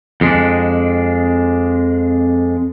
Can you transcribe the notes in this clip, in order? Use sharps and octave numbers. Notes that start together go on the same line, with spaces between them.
F2 G#3 D4